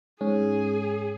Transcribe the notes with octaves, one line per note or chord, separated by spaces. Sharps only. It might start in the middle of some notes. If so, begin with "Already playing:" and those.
G#2 C#4 G#4